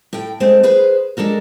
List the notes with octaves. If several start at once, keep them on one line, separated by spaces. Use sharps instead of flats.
A2 G5
G#3 A3 C4
G#4 B4 C5
G#3 D4 A4 A#4